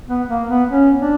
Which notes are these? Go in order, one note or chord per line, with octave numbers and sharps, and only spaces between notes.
B3
A#3
B3
C#4
D4